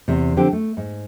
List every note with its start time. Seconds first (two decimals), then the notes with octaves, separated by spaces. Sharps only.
0.08 E2 C3
0.37 D3 F3 C4 G4
0.53 A3
0.77 G#2